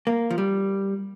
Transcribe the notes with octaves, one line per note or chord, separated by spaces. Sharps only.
A#3
F3
G3